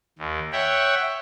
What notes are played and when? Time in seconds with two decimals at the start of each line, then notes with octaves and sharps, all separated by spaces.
0.18 D#2
0.52 C#5 E5 F#5 G5